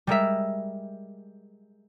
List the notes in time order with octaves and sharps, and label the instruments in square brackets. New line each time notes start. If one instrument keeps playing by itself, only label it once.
[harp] G3 G#3 A#4 E5